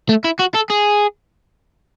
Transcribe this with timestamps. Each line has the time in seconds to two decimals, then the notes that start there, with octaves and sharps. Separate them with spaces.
0.09 A3
0.24 E4
0.39 F#4
0.54 A4
0.70 G#4